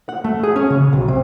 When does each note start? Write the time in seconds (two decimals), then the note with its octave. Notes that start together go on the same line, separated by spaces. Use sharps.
0.09 F#5
0.24 A3
0.43 G#4
0.56 C#4
0.70 C#3
0.93 B1
1.08 C3